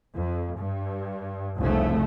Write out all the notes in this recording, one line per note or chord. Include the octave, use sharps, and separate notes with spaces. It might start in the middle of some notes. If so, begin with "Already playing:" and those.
F2
G2
F1 C2 C#3 A3